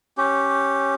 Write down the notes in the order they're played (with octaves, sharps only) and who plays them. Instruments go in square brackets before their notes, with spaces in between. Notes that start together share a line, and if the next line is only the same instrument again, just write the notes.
[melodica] C#4 G4